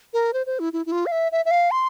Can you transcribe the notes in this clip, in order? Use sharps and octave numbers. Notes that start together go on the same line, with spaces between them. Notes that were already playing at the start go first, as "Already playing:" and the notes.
A#4
C5
C5
E4
E4
E4
F4
F5
E5
E5
E5
F5
C6